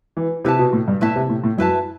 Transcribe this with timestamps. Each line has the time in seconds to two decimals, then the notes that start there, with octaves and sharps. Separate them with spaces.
0.17 E3
0.45 C3 E4 B4 E5 A5
0.59 B2
0.73 A2
0.88 G2
1.01 A2 E4 B4 E5 A5
1.16 C3
1.29 A2
1.44 A2
1.58 F#2 E4 B4 E5 A5